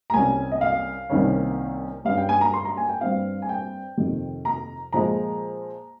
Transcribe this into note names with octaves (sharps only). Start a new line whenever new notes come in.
A#5
C2 C3 G3 C#4 G#5
D#5
F5
C2 C3 D#3 A#3 C#4
G2 G3 C#4 F5
G5
G#5
A#5
C6
A#5
G#5
G5
G2 G3 C4 F5
G#5
G5
F2 C3 D#3
A#5
A#2 F3 G#3 A#5